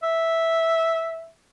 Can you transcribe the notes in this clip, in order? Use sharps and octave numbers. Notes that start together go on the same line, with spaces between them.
E5